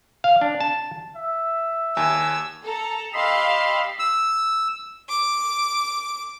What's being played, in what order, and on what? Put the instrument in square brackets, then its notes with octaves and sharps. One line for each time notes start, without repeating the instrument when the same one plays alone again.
[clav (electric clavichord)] F5
D4
A5
[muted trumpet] E5
[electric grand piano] D#2 [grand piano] G#5 [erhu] E6
[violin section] A4 A#5
[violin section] G4 F5 E6 [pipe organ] D#5 B5 C6
[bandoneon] E6
[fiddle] D6